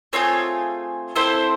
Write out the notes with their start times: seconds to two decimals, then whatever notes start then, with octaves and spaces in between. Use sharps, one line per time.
0.13 A3 C4 F4 G#4 C#5
1.16 C4 E4 A4 C5